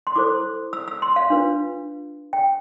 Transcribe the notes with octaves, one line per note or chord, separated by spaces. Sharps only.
C6
E4 A4 C5 D6
E6
E6
C6
F5
D4 F4 B4
G5